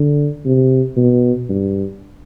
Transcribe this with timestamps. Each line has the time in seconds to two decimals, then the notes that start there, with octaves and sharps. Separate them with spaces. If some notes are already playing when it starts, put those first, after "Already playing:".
Already playing: D3
0.45 C3
0.97 B2
1.49 G2